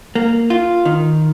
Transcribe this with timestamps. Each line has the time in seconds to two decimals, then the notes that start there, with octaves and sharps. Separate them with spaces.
0.15 A#3
0.50 F4
0.85 D#3